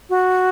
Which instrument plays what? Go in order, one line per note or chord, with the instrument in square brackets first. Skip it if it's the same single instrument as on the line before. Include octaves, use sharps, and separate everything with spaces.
[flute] F#4